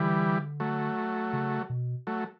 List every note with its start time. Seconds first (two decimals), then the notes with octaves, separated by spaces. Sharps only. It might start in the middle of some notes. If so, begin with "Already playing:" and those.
Already playing: D3 E3 G3
0.60 F#3 A3
1.33 C#3
1.70 B2
2.07 F#3 A3